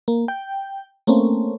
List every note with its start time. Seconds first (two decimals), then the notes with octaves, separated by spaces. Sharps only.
0.08 A#3
0.28 G5
1.07 A3 A#3 C4 C#4